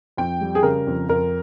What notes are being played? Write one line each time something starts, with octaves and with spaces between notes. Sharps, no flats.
F2 G5
G3
G#4
C#3 A#4
F2
F2 A#4